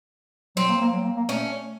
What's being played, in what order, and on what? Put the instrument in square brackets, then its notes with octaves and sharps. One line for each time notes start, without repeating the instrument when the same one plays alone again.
[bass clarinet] F#3 [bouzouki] C4
[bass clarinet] A#3
A#3
F#3
A#3
A#3
[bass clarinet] A3 [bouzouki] C#4